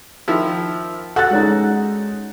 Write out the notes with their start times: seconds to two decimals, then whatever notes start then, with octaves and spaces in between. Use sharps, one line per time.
0.28 D#3 F3 E4
1.16 F#4 A4 F#5 F#6 A6
1.31 G#3 C#4 D#4